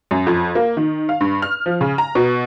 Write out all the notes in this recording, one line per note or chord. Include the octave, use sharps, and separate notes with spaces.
F#2
F2
A#3
D#3
F5
G2
F6
F3
C#3
A#5
B2